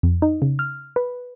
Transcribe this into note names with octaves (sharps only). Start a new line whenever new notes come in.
F2
D#4
C#3
F6
B4